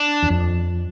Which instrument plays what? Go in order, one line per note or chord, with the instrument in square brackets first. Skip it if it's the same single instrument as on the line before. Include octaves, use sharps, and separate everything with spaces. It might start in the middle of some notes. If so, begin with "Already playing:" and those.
Already playing: [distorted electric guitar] D4
[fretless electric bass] E2
F2